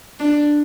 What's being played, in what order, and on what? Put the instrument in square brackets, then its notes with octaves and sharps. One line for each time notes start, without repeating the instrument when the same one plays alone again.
[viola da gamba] D4